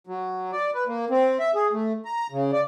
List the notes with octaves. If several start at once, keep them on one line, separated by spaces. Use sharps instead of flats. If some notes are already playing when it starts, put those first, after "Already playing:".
F#3
D5
B4
A#3
C4
E5
G#4
A3
A#5
C#3
D5